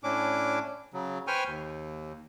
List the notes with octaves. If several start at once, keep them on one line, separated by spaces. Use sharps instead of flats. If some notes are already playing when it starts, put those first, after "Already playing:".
A2 C#4 D4 D6
C#3 F#3
B4 C5 G5 G#5 C#6 F6
D#2